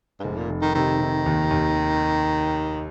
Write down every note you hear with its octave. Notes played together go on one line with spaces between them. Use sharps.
G2
F1 G#2
A#2
F1
D#3
C3 D#3
C3
D#2
D#2